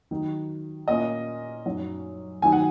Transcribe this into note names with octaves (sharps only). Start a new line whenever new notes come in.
D#3 F#3 D#4
A#2 A#3 C#4 D#5
F#2 F#3 D#4
D#3 F#3 D#4 G#5
F#5